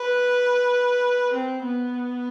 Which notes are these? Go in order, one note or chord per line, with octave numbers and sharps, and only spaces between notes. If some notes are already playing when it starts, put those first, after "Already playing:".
Already playing: B4
C4
B3